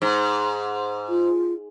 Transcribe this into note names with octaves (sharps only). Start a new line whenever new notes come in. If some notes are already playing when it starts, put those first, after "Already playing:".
G#2
F4